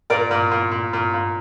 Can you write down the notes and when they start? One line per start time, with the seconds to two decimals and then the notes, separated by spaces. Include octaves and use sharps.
0.10 A#2 A#4 D5
0.31 A#2
0.51 A#2
0.72 A#2
0.93 A#2
1.14 A#2